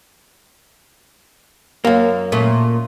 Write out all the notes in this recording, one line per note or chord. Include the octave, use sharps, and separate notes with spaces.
F#2 A#3
A#2 A3 C#4